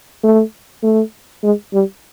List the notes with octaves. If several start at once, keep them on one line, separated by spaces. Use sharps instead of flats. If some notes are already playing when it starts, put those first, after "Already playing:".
A3
A3
G#3
G3